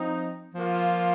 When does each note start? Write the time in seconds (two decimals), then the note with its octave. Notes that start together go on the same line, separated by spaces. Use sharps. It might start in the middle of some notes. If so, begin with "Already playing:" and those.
Already playing: F3 C4 D#4
0.55 F3 A#3 F4